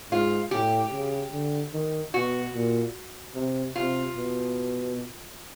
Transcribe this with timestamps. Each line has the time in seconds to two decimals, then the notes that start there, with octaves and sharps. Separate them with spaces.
0.11 G#2 F4
0.51 A2 G4
0.92 C#3
1.33 D3
1.74 D#3
2.14 B2 F#4
2.54 A#2
3.35 C3
3.75 C3 F4
4.17 B2